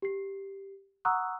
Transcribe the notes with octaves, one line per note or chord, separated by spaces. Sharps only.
G4 C7
F#5 A#5 C#6 D#6 E6 F#6